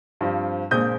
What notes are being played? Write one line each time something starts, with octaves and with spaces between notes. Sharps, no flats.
G2 F3 C4
A#1 A#2 G#3 C4 D#6 G6